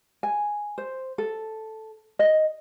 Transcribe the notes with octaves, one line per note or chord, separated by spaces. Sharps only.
G#5
C5
A4
D#5